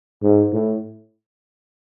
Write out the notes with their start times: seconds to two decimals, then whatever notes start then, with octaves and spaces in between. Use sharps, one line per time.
0.22 G#2
0.52 A2